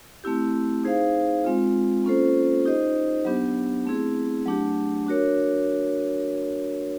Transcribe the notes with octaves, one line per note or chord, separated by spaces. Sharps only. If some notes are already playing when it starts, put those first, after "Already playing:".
A3 C4 E4 G4
D#4 G#4 C5 F5
G#3 C4 F4
A#3 C#4 F4 A4 C5
D#4 G4 C5 D#5
F#3 B3 D4 G4
A3 C4 E4 G#4
F#3 A3 D4 G4
D4 F#4 A#4 C#5